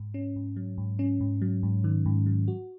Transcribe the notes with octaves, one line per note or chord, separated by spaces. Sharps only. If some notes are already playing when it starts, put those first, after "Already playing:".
Already playing: G#2
C#4
G#2
F#3
G#2
C#4
G#2
F#3
G#2
D#3
G#2
F#3
F#4